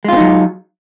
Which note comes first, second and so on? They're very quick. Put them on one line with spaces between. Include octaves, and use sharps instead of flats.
G#3 F4 C4 D#4 F#3